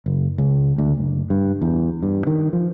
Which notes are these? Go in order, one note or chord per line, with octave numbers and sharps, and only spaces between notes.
F#1
C#2
D2
F#1
G2
E2
G2
D#3
F3